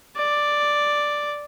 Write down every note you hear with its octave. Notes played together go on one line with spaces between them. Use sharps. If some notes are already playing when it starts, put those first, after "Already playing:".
D5